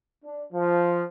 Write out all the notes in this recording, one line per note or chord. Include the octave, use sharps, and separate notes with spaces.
D4
F3